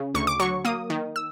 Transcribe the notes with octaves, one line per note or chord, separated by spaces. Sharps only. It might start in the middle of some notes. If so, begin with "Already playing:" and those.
Already playing: C#3
D2 C#6
D6
F#3 C#6
A#3 D#6
D#3
E6